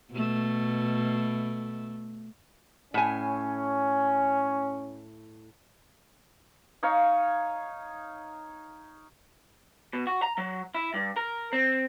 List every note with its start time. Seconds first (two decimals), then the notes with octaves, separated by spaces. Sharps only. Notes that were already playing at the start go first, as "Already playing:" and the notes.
0.12 B2 A3
2.94 A2 C#4 G#5
6.83 D#4 C#5 F5
9.93 B2
10.07 F#4
10.22 A#5
10.38 F#3
10.75 E4
10.94 G2
11.16 A#4
11.53 C4